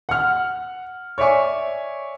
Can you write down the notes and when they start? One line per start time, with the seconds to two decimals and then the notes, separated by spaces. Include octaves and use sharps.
0.09 F#5 F6
1.18 C#5 D5 E5 G#5 C#6